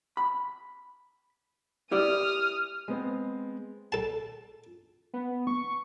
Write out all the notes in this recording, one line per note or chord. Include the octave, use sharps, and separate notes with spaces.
B5
E4 G4 D5 D#6 F6
G#3 B3 C4
A4 A5
B3
C#6